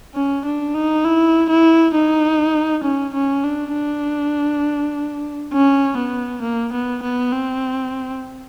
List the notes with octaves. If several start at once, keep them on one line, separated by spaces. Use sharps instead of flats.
C#4
D4
D#4
E4
E4
D#4
C#4
C#4
D4
D4
C#4
B3
A#3
B3
B3
C4